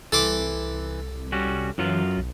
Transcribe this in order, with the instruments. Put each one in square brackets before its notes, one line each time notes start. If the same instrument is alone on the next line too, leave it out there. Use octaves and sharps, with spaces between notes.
[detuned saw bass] C2 [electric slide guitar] E3 [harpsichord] A4 C6 D6
[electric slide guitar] G3 C#4 F#4
[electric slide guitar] F#2 F#3 F4 [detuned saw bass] E3
[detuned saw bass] B1